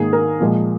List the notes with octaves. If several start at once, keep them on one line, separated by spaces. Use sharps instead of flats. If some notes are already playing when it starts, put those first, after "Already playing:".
Already playing: G#2 D#3 A#3 G#4
A#4
A#2 F3 G#3